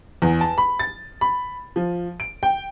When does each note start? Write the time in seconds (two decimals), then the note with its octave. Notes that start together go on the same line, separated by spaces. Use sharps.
0.22 E2
0.41 A5
0.58 B5
0.79 A6
1.21 B5
1.76 F3
2.20 D7
2.43 G5